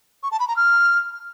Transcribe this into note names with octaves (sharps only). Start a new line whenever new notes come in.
C#6
A5
B5
A#5
F6